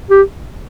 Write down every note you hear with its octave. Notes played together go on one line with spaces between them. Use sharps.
G4